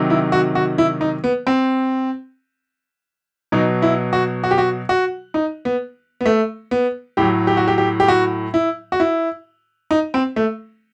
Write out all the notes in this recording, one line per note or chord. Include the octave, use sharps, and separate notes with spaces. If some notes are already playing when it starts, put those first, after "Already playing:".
Already playing: C3 D#3 F#3
E4
F#4
F#4
E4
D#4
B3
C4
B2 F#3 D#4
E4
F#4
F#4
G4
F#4
F#4
D#4
B3
B3
A3
B3
A2 F#3 G4
G4
F#4
G4
G4
G4
F#4
E4
F#4
E4
D#4
C4
A3